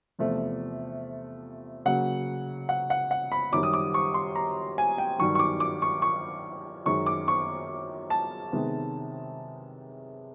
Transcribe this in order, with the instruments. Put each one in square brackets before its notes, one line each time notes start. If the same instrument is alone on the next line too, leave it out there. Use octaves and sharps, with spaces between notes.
[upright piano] E2 C3 F3 A3
C#3 F#3 A#3 F#5
F#5
F#5
F#5
B5
F#2 D#3 G3 D6
D#6
D6
C#6
C6
A#5
G#5
G5
G2 D#3 F#3 C#6
C#6
D6
D6
C#6
C#6
F#2 D#3 G#3 C#6
D6
C#6
A5
C3 D#3 G#3 B3